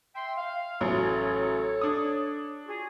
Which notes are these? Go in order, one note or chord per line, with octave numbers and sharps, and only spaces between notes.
E5 G5 C6
F5
A1 F#3 A4 C#5
D4 D#6
F4 F#4 G#4